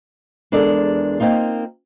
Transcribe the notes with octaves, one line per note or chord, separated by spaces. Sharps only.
E2 G#3 D4 A4 A#4 D5
A#3 C4 D#4 F4